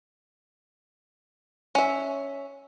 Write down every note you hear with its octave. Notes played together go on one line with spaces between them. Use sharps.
C#4 E5